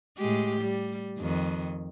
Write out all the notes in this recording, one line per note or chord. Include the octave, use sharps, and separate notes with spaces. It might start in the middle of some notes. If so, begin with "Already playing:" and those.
A2 G#3 G4
G3
F2 D#3